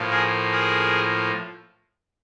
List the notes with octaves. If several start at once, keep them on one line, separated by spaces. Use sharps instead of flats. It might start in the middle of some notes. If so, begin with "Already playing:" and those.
Already playing: A2 F3 A#3
G#4 A#4
G#4 A#4